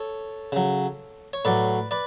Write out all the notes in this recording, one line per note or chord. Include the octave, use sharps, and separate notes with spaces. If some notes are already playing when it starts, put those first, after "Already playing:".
Already playing: A4 C#5
C#3 F#3
C#5
A2 F#3 B4 D5
B4 D5